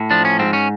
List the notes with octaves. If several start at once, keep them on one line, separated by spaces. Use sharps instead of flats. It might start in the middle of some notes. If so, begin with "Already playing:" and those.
Already playing: A2
F3 D4
C#4
G#2 C4
C#4